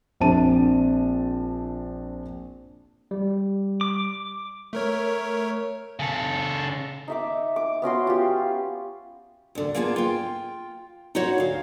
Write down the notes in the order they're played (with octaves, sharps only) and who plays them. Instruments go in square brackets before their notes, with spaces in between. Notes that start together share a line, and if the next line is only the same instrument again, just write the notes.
[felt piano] A#1 C4 D4 A5 D#7
[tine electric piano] G3
[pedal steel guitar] D6
[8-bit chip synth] A3 A#4 C#5
[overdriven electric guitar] C#3 A4
[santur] D#4 E5 D6
D6
B3 C#4 F#4 C6
F4 G4
[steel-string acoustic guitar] D2 D3
A#3 B3 F4 G#4 F5 A5
F4 G5
D#4 E4 F#4 C5 C#5 F#5
D2 F5